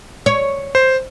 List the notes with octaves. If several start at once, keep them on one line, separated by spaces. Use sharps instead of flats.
C#5
C5